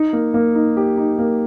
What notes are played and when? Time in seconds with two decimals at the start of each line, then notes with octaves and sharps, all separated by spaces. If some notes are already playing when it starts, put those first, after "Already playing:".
Already playing: D#4
0.13 A#3
0.34 A#3
0.55 D#4
0.77 G4
0.97 D#4
1.19 A#3